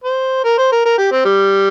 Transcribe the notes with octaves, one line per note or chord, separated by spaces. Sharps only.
C5
A#4
C5
A#4
A#4
G4
C4
G3